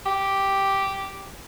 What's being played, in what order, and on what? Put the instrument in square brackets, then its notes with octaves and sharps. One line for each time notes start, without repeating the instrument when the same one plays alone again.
[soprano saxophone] G4